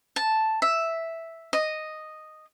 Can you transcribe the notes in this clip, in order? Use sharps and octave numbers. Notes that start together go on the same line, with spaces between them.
A5
E5
D#5